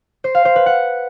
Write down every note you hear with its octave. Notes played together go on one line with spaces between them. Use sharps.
C5
F5
C5
B4
F#5